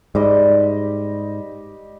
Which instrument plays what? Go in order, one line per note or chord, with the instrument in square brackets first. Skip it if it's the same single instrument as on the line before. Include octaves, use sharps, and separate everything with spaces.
[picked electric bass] G#2 [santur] G3 G4 D#5